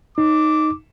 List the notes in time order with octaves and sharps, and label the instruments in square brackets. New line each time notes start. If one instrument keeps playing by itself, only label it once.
[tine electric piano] D#4 [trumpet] D6